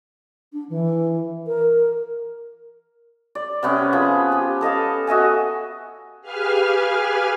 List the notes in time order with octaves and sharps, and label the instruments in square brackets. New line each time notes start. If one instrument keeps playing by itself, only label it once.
[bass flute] D4
E3
A#4
[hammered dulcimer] D5
C3 B3 C#4
F3 G#4 B5
G4
A4 D#5 F5 A5
F#4 D#5 E5 G#5
[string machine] G4 G#4 B4 F5 G#5 F6